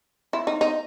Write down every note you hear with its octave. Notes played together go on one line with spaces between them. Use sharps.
E4
D#4
D#4